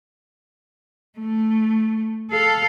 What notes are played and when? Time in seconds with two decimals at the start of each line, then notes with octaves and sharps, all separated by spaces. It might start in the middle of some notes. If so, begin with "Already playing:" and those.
1.19 A3
2.31 A4 F5